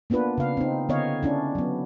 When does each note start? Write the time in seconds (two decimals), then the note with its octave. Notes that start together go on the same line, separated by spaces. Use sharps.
0.10 A#3 B3 D4 F4 B4
0.38 C#3 F5
0.57 C4 D#4
0.89 D3 B3 C#5 D#5 F5
1.23 C#4 D4 E4
1.55 F#3 B3